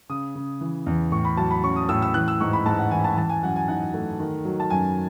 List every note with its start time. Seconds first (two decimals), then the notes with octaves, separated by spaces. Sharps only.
0.09 C#3 D#6
0.35 C#3
0.61 E3
0.86 E2
1.12 A2 C#6
1.25 B5
1.37 F#3 A5
1.51 B5
1.63 C#4 C#6
1.76 D#6
1.89 A2 E6
2.02 E6
2.14 E3 F#6
2.28 E6
2.40 G#2 C#6
2.53 B5
2.66 G#2 A5
2.79 F#5
2.91 E3 G#5
3.04 A5
3.17 E3 A5
3.29 G#5
3.43 F#2 F#5
3.56 G#5
3.68 D#4 F#5
3.94 A3
4.19 D#3
4.45 F#3
4.60 A5
4.70 F#2 G#5